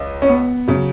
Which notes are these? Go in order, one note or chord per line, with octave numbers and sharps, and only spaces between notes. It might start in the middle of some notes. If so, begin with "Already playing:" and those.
Already playing: C#2
C#4
B3
C#3 F#3